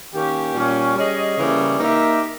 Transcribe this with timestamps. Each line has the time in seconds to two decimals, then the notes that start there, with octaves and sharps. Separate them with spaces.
0.13 D#3 A#3 C#4 G4
0.54 A#2 G3 C#4
0.96 G3 C#4 G#4 D#5
1.37 C#3 E3 G3 A#3
1.79 A#3 D#4 G4 A#4 E5